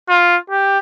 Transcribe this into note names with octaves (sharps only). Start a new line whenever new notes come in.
F4
G4